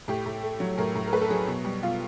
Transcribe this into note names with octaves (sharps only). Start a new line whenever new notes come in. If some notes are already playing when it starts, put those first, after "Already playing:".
A2 G4
A2
A3
F#3
A2 A#4
A2
A#4
A3 B4
A4
F#3 G#4
B2
G3
B2 F4